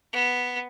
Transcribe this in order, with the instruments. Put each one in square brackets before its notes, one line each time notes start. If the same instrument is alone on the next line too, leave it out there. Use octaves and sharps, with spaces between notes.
[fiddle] B3